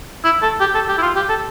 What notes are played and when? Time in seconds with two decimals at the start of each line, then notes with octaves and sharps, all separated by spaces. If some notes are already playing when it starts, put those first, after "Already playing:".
0.25 E4
0.42 A4
0.61 G4
0.75 A4
0.88 G4
0.98 E4
1.02 F4
1.16 G4
1.29 A4